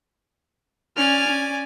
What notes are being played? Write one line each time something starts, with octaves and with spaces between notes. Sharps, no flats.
C#4 D5 G#5 F6
C#4